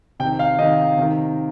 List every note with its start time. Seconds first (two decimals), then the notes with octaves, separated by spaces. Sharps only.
0.20 C3 G5
0.24 D#3
0.39 F5
0.59 C3 D#3 D#5
0.98 C3 D#3